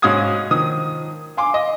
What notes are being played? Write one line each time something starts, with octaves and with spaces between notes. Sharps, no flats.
G#2 C#4 F#4 F5 D#6 G#6
D#3 F3 D#6
F5 G#5 C6 D6
D#5